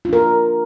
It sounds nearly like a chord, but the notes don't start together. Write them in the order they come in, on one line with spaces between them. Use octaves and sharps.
F4 D4 A#4